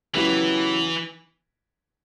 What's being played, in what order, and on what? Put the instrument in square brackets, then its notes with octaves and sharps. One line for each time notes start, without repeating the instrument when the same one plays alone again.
[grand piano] C#3 F#3 B3 E4 G4 [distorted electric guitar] E3